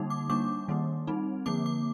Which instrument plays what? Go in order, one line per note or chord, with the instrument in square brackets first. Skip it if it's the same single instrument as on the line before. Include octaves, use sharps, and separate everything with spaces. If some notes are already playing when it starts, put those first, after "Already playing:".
Already playing: [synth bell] D3 G3 A#3 D#4
D6
G3 A#3 D4 D6
D#3 G3 A#3
G3 C4 D#4
D3 F3 A#3 D6
D6